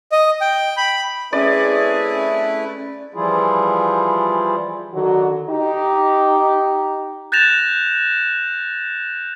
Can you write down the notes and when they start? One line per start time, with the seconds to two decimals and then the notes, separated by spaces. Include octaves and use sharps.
0.12 D#5
0.41 G5
0.77 B5
1.33 A3 C4 C#4 E4 G#4 B4 D5
3.14 E3 F3 G3 E4 F4 G#4
4.94 D3 D#3 F#3 F#4
5.49 D#4 G4
7.32 F#6 G6 A6 A#6 E7 F7